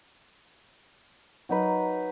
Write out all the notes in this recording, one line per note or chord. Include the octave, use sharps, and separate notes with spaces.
F#3 D#4 B4